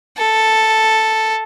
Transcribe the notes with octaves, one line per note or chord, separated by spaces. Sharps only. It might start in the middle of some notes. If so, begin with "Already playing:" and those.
A4